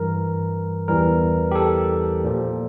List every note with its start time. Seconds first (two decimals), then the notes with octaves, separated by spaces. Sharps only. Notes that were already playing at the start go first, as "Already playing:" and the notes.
Already playing: G2 E3 G3 A#4
0.88 E2 E3 G3 A#4
1.51 G4
1.55 A4
2.24 A#2 F3